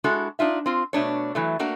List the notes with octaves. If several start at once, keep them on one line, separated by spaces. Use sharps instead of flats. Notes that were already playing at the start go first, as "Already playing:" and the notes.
G#3 D4 E4 F#4 A4
D4 D#4 F4 E5
C4 F4
B2 A3 D4 C#5
E3 F#3 A3
A3 A#3 D4 F#4 A#4